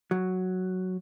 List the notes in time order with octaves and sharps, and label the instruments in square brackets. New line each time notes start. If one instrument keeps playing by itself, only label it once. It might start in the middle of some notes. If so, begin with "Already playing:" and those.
[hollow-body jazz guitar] F#3